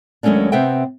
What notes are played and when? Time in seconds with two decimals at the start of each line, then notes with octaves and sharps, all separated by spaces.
0.23 D#2 F#3 G#3 A3 C#4 D4
0.52 C3 B3 C4 E5 G5